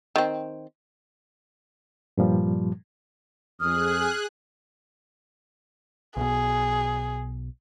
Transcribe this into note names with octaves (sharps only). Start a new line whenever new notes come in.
D#3 C4
G2 A#2 F3 G3
F2 G#4 D#6 F6 F#6
B1 B2 G#4